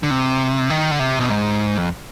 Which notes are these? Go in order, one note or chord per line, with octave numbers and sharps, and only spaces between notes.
D3
C3
D#3
D3
C3
B2
G#2
F2